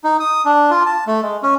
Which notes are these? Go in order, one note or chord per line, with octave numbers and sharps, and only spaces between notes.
D#4
D#6
D4
F4
A5
A3
G#3
C#4